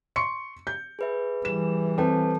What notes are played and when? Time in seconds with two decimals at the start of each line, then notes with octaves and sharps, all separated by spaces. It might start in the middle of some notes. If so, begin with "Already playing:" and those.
0.16 C6 C#6 C#7
0.67 G6
0.99 G#4 B4 E5
1.45 E3 G3 E7
1.98 C4 A4 B4 G5 A5